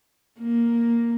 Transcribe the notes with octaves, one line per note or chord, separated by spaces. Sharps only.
A#3